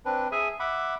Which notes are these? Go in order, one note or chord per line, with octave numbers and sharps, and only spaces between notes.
C4 D4 B4
G#4 E5 G#5
E5 F#5 B5 D6